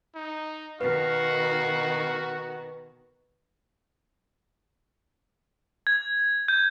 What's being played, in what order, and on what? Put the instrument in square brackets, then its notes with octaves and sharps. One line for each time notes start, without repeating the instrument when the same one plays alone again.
[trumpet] D#4
[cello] B2 D#3 [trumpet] F#4 [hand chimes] B4 [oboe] F5
[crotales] G#6
G6